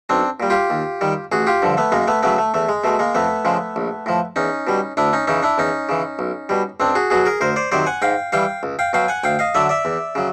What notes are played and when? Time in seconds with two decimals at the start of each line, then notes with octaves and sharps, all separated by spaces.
0.09 B1 C4 D4
0.40 A#2 G3
0.50 F4 G4
0.70 D#2
1.01 D#3 G3
1.32 A1 F#4 G#4
1.47 F4 G4
1.62 G2 D3 F3
1.77 A3 B3
1.92 F#2 G#3 A#3
2.08 A3 B3
2.23 C#3 F#3 A3 B3
2.38 A3
2.54 E2 A3
2.69 G#3
2.84 B2 G#3 A3
2.99 G#3 A#3
3.15 F2 A3 B3
3.45 C#3 F3 G#3
3.76 A#1
4.06 A2 F3
4.36 E2 C#4 D#4
4.67 B2 G3
4.97 D2 D4 E4
5.13 C#4 D#4
5.27 C#3 E3 C#4 D#4
5.43 D4 E4
5.58 E2 C#4 D#4
5.89 C#3 E3
6.19 B1
6.49 B2 G3
6.80 C#2 C4 D4
6.95 F#4 G#4
7.10 B2 F#3 F#4 G#4
7.25 G#4 A#4
7.41 D2 A#4 C5
7.56 C5 D5
7.72 C3 D#3 F#3 C5 D5
7.86 F#5 G#5
8.02 G#2 F5 G5
8.32 E3 G3 F5 G5
8.63 C#2
8.79 F5 G5
8.93 B2 F#3 F5 G5
9.08 F#5 G#5
9.24 D2 F5 G5
9.39 D#5 F5
9.54 D3 F#3 D5 E5
9.69 D5 E5
9.85 E2
10.15 C#3 F#3